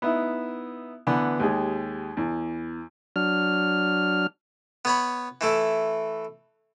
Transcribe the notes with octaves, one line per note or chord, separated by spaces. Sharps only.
B3 D#4 E4
D3 E3 B3
D#2 G#3 G4
E2
F#3 D4 F6
B3 C#5 B5
E3 A3 E4